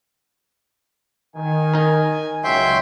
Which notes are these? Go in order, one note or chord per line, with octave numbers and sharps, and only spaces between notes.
D#3 G#5
D#4 A#4
C#2 F#3 C#5 E5 G5 C6